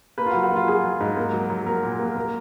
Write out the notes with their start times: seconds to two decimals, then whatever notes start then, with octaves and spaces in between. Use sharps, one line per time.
0.18 A#3 B4
0.26 F4
0.31 F#4
0.34 F#3
0.43 F#4
0.51 A#3 F4
0.68 F#3 G#4
0.84 F#3
1.00 G#2
1.17 A#3
1.33 F#3
1.50 F#3
1.67 A#3 A#4
1.83 A#2
1.99 A#3
2.16 A#3